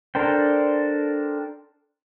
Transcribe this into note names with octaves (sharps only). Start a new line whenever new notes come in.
D4 A4 A#4 C5 G5